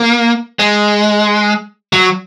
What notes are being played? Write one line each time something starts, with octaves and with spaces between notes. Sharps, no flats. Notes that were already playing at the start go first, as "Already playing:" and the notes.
Already playing: A#3
G#3
F#3